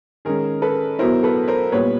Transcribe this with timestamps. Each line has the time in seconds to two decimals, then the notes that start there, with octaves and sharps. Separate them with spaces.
0.25 D#3 G#3 C#4 G#4 A#4
0.62 A4 B4
0.99 B2 F#3 B3 E4 A#4 C5
1.23 A4 B4
1.48 A#4 C5
1.72 A#2 G3 B3 B4 C#5